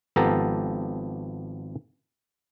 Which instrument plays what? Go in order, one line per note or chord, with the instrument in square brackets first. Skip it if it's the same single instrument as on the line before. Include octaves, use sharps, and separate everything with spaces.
[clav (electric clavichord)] G#1 F3 B3 G4 A4 A#5